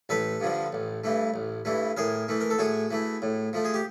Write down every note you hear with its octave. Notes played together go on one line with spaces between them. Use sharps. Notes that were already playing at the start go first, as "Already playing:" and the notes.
A1 A4 B4
G2 D3 F3
A1
G2 E3 A3
A1
G2 E3 A3
A2 G#4 A#4
E3 A3
A#4
A4
A2 F#4 G#4
E3 A3
A2
F3 A3
G#4
G4